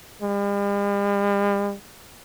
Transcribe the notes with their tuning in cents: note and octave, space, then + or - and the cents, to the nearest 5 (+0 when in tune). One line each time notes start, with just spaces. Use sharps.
G3 +45